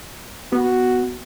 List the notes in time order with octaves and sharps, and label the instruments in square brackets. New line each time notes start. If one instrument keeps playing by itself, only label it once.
[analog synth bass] B3 [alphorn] F#4